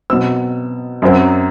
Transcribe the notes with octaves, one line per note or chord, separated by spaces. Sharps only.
B2 F#3 C4 E6
F#2 F#3 C4